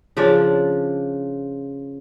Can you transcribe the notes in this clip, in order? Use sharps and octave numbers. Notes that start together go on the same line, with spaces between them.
C#3 F3 D4 D5